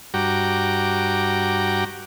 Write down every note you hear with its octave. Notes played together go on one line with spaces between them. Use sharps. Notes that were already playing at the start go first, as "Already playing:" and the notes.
G2 F#4 G5 A#5 D6